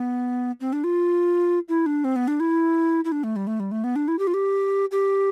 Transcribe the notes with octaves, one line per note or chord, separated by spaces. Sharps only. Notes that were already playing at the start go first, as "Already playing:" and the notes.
Already playing: B3
C4
D4
F4
E4
D4
C4
B3
D4
E4
E4
D4
A3
G3
A3
G3
A3
B3
D4
E4
G4
F4
G4
G4